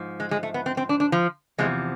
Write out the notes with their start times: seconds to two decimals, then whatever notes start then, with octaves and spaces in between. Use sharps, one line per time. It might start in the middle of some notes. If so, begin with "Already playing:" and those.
Already playing: G#2 F3
0.20 G#3
0.31 G#3
0.43 A3
0.54 B3
0.66 C4
0.77 C4
0.89 D4
1.00 D4
1.12 F3
1.58 E2 C3 F3 G#3